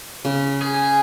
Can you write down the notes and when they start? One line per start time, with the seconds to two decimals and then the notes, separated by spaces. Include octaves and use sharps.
0.25 C#3
0.62 G#4